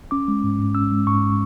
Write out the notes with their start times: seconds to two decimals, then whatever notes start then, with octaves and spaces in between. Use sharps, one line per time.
0.11 C#4 D6
0.28 G#3
0.44 G#2
0.59 G#2
0.75 C#4 E6
0.91 G#3
1.07 G#2 C#6